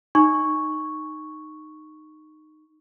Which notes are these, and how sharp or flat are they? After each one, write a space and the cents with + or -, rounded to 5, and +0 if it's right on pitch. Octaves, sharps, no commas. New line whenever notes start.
D#4 -10 C#6 +0